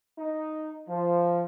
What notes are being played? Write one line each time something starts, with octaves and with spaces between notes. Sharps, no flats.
D#4
F3